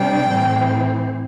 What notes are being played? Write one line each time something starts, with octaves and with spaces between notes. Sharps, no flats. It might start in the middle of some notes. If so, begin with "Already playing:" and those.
Already playing: C3 G3 D4 G5
A2 E3 C4